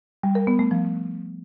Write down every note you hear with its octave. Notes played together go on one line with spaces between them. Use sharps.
G3
A#4
B3
A3
F3